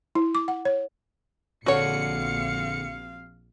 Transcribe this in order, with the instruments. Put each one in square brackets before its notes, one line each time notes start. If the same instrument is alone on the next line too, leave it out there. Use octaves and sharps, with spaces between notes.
[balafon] E4
D6
F#5
C#5
[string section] A#1 C#7 [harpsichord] D3 [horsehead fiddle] C4 F5 [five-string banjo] F#4 C#5